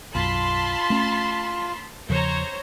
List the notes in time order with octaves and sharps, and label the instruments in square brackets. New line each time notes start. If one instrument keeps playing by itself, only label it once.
[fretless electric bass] B1 F#2 [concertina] F4 [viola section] A5 B5 C6
[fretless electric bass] A3 C#4
[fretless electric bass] E2 C#3 F3 [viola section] C5 C#5 A#5